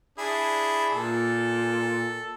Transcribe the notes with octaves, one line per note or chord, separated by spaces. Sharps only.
D4 E4 G#4
A#2 A4